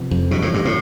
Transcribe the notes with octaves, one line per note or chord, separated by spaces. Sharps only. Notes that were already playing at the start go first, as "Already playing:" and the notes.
Already playing: C3 F3 B3
F2
B2 E3 G3 D4
A2
G2
A2